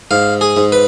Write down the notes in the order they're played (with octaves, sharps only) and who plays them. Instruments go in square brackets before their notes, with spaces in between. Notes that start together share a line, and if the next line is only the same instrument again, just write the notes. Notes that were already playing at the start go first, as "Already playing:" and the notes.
[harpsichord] G#2 F5
G#4
G#2
B4